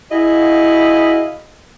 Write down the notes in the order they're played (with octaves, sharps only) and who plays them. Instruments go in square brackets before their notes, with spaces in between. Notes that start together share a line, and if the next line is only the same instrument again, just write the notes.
[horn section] E4 F#4 G#4 D#5 F5